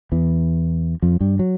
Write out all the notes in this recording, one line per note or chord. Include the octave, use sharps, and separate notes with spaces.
E2 E3
F2 F3
G2 G3
F#3